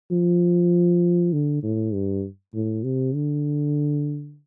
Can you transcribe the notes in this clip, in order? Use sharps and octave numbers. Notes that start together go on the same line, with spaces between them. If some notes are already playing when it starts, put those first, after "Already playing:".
F3
D3
A2
G2
A2
C3
D3